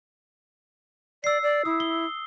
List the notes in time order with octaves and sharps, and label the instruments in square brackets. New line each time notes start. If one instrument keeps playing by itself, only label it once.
[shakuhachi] D5 [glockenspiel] E6 C7
[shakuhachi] D5
[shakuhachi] E4 [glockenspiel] D#6 E6
[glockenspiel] G7